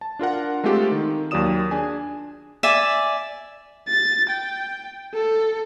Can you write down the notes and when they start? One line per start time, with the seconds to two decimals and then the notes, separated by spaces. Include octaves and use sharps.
0.01 A5
0.19 D4 F4 A#4 F#5
0.64 G#3 A3 C4 F4 G4 A4
0.92 D#3
1.31 D#2 F#3 F4 D5 D#6 E7
1.71 D4 G#4 G#5
2.63 D5 E5 G#5
3.87 A6
4.30 G5
5.14 A4